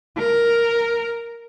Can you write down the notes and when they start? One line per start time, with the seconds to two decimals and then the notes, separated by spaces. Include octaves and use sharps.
0.18 A#4